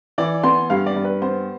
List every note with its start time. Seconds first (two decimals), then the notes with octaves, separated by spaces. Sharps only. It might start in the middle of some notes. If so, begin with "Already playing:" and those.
0.18 E3 D5
0.43 B3 C6
0.70 G2 F5
0.86 D5
0.96 G2
1.04 B4
1.22 B3 C5